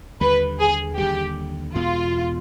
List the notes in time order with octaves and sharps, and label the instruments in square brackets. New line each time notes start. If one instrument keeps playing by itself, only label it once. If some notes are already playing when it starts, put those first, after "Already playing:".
[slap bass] D#2 D3 G3 [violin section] B4
[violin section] G#4
[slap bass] D#2 D3 G3 [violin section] G4
[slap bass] E2 B2 G#3 [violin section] F4